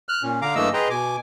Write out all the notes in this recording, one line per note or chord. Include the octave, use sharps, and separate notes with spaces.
F6 F#6
A#2 C#4
D3 F5 A#5 D6
G2 E3 A3 A#3 D#5 E6
G#4 B4 D#5 G5 A#5 C6
B2 G#5 D6